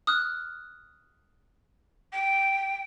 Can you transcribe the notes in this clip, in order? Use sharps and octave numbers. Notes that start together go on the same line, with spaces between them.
D#6 F6 F#6
G5